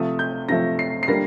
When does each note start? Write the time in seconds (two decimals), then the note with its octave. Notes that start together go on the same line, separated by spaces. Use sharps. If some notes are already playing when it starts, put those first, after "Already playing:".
Already playing: C3 F3 A3 D#6
0.19 G6
0.49 C3 F3 A3 A#6
0.79 C7
1.03 C7
1.08 D3 G3 A#3 D4 A#6